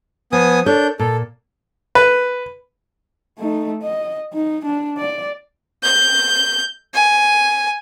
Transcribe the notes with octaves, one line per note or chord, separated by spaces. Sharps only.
F3 B3 G#5 D#6
D4 A4 A#4 C#5 G6
A#2 A4
B4
A3 D#4
D#5
D#4
D4
D5
G6
G#5